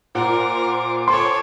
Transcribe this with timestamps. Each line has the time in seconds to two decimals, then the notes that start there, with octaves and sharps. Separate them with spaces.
0.15 A#2 A#4 C5 F#5 D6
1.08 A4 C#5 C6